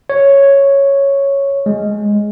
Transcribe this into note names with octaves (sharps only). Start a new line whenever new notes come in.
C#5
G#3